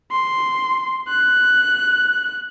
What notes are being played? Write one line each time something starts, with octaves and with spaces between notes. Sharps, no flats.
C6
F#6